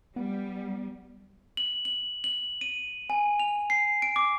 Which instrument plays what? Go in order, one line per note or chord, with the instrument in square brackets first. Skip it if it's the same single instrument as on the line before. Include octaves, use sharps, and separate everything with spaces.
[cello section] G3 [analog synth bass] B3
[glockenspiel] F#7
F#7
F#7
D#7
G#5
F7
C7
D7
D6